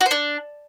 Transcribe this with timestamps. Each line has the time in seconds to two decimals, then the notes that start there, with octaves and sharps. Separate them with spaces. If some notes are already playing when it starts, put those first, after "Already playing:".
0.01 F#4
0.06 C5
0.11 D4